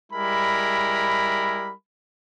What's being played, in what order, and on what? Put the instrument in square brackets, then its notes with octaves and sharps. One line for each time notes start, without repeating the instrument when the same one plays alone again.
[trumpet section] G3 G#3 E4 A#4 B5